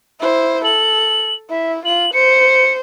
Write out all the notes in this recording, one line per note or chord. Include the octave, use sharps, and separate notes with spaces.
E4 C5
A4 F#7
E4 E5
F4 F#7
C5 C#7